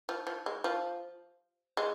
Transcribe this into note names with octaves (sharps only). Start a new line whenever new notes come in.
F3
F3
G#3
F3
G#3